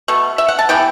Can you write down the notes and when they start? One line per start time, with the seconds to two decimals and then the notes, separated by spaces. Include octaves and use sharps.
0.08 B2 A3
0.38 E5
0.48 F#5
0.59 A5
0.69 E3 G3 B3 G5